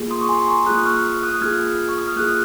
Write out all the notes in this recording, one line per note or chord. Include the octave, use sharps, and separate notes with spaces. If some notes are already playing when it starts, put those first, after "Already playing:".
Already playing: A#3 F4 G#4
C6 D#6
C#6
G#5 C6
C6
A#5 C#6
A#3 F4 G#4 D#6 F#6
C#6 F6
D#6 F#6
A#3 F4 G#4 F6 G#6
C#6
D#6
F6
A#3 F4 G#4 D#6 F#6